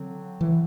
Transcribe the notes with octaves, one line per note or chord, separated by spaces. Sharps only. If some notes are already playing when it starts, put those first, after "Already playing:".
Already playing: D3 F#3 C4
E3